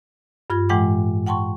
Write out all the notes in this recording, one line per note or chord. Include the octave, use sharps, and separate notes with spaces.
G2 F4 G#6
A2 E3 G#3 F#5 G5 D6
F#5 G5 A5 C6 C#6